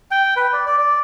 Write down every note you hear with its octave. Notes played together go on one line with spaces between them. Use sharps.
G5
B4
D5
D5
D5